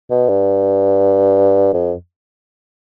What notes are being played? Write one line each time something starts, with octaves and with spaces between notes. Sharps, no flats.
B2
G2
F2